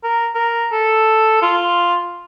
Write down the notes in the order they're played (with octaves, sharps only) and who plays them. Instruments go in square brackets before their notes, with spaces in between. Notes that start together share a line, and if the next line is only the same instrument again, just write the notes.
[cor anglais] A#4
A#4
A4
F4